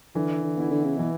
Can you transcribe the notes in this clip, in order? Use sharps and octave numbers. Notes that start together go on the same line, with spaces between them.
D3 E3
D3
B3 E4
D3
C#3
B2 E3